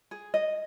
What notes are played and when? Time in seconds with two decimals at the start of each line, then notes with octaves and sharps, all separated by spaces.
0.11 G#4
0.34 D#5